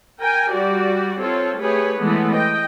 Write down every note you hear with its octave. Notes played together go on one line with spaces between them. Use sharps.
A#4 G5 G#5
G3 F#4 G4 D5
C4 F4 A4 C#5
A3 G4 G#4 B4 C#5
E3 G#3 A3 B3
D#5 G5